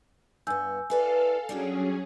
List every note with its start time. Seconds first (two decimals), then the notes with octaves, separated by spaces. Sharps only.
0.47 G2 B3 G#5 E6 G6
0.90 E4 A4 B4 D5 F5 G#5
1.49 F#3 G3 C#4 D4 G#4 G5